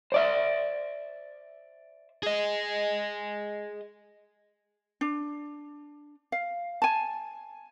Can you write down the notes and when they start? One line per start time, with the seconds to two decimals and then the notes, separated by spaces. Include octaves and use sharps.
0.12 C5 D5 E5
2.23 G#4 D#5
5.01 D4
6.32 F5
6.82 G#5 A5